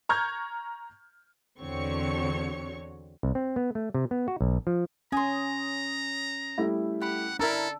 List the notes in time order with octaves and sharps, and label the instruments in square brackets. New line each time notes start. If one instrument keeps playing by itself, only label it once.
[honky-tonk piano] A#5 C#6 F6 G6 G#6
[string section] E2 D3 C4 F#4 C#5 C#6
[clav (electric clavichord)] C2
C4
B3
A3
C3
B3
F#4
B1
F3
[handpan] C#4 [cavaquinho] G#5 C6 [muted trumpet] A#5 [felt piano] D#6
[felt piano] G3 A3 E4
[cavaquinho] G4 B5 [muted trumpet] F#5
[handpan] D4 [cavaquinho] E4 A#4 A5 [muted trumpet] A4 [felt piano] A#5 E6